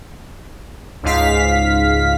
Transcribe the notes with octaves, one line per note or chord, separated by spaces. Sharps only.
C#2 G#2 F5 B6